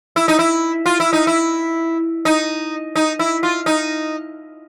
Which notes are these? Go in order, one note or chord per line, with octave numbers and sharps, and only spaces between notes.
E4
D#4
E4
F4
E4
D#4
E4
D#4
D#4
E4
F4
D#4